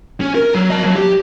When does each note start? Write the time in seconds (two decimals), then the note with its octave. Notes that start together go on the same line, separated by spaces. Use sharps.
0.21 C#4
0.35 A#4
0.55 F#3
0.70 D#5 A5
0.82 E2 F#3
0.96 G4